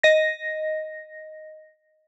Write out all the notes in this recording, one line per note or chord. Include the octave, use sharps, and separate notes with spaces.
D#5 A#6